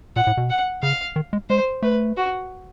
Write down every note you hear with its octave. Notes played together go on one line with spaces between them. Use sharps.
A#2 F#5
A2
B2
F#5
C#3 F5
D#3
G#3
G#3 C5
A3 B4
F#4